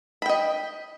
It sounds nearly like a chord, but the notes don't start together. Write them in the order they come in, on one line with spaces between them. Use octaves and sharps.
B5 G5 D#5